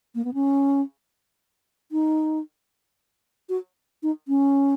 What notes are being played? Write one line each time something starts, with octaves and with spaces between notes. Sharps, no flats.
A#3
B3
C#4
D#4
F#4
D#4
C#4